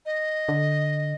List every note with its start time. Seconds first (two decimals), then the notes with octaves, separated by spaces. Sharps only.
0.06 D#5
0.49 D3